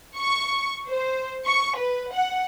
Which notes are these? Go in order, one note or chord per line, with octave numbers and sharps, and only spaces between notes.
C#6
C5
C#6
B4
F#5